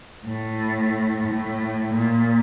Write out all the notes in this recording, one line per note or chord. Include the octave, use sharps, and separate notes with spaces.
A2
A2
A#2